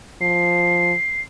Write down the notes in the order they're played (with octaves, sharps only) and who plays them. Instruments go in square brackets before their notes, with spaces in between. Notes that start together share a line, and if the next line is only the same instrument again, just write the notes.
[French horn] F3 [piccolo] C7